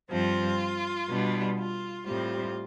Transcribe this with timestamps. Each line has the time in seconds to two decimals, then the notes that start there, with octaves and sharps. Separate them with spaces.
0.10 G2 F3 C4 F4
1.08 B2 G3 B3 D4
1.58 F4
2.06 A2 G3 C4 F4